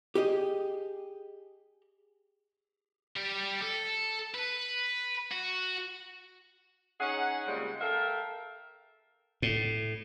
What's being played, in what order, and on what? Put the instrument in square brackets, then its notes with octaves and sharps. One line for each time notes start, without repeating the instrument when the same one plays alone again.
[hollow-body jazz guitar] G4 G#4 D#5
[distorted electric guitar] G3 G4
A4
B4
F#4
[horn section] C#4 D#4 G#4 F#5
A#2 C#3 G3 G#3 C4
A4 A#4 E5 F5 G5
[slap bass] A2